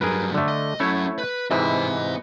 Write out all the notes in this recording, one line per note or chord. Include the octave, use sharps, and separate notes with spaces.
G2 F#3 G#4 A#4 B4
D3 A3
D#5
F#3 A3 C#4 E4 C#5
B4
G#2 C3 E3 D#5 B5